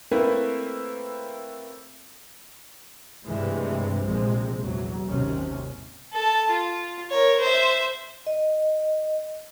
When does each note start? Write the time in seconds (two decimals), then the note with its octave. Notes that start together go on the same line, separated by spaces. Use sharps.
0.11 A3 A#3 C4 E4 B4
3.24 G2 C3 E3 G#3 A3
4.04 A#1 C3 G#3
4.62 E2 F#3
5.08 G#1 D#2 C3 C#4
6.13 A4 A5
6.50 F4
7.10 A#4 C#5
7.40 C5 E5
8.27 D#5